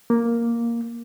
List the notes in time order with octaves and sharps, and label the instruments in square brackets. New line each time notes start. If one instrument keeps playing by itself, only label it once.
[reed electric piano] A#3